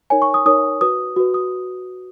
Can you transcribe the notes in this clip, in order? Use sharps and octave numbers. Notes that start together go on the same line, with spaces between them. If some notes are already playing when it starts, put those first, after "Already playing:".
D#4 A#4 C#5 G#5
C#6
D#6
D#4 A#4 C#5 D#6
F#4 B4 D#6
F#4 B4
D#6